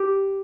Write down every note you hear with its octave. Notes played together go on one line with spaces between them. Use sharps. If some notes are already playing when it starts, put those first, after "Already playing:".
Already playing: G4